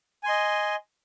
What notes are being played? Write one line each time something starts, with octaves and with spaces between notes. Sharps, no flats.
D#5 G#5 C6